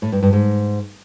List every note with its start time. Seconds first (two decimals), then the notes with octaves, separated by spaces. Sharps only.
0.02 A2
0.12 G2
0.22 G2
0.33 G#2